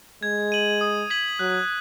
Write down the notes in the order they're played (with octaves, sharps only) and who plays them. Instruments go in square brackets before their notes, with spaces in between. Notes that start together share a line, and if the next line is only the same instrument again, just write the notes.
[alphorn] G#3 [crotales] G#6
[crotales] D#7 F#7
D#6
G#6 B6 D#7 F#7
[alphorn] F#3 [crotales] F#6